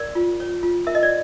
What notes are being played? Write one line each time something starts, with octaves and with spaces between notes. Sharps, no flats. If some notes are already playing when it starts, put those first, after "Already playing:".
Already playing: A#4 D5
F4
C#5
F4
A#4 E5
D#5
D5